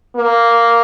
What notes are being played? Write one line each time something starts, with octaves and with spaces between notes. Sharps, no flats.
A#3